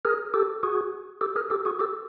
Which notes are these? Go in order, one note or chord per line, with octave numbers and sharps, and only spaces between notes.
G#4 A#4
G4 A4
F#4 G#4
G4 A4
G#4 A#4
G4 A4
F#4 G#4
G4 A4